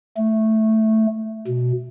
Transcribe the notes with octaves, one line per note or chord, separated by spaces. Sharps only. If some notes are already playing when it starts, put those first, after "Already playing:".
A3
B2